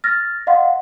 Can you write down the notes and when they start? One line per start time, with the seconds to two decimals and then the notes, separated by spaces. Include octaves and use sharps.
0.04 F6 A6 A#6
0.47 D#5 F5 F#5 C6